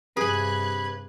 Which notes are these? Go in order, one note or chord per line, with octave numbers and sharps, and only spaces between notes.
G2 C3 G#4 B4 G#5 F#6 G#6